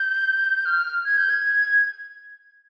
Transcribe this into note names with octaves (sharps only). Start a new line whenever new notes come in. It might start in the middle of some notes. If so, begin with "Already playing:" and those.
Already playing: G6
F6
G#6
G6
G#6